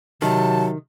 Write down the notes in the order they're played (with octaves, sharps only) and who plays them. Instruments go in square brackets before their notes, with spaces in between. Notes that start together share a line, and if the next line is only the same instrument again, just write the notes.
[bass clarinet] C3 [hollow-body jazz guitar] D#3 [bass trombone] F#3 [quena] A5